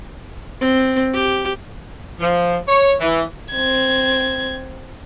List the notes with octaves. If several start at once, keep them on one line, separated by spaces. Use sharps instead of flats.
C4
G4
F3
C#5
E3
C4 G#6